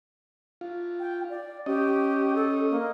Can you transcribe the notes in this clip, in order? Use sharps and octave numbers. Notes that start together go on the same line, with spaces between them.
F4
G5
D5
C#4 G4 D#5
A4
A#3